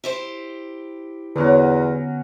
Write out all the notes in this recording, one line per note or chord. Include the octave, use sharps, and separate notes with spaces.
E4 G4 C5
E2 D3 F#3 B3 C#4 F#4